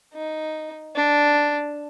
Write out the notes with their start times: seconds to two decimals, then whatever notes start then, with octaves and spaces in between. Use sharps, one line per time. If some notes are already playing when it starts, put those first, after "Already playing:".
0.14 D#4
0.96 D4